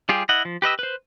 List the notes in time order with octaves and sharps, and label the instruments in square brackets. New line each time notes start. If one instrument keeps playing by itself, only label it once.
[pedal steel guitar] G3 F4 G4 G#4
E4 D#5 F#5
F3
G4 B4 D#5 E6
B4 C5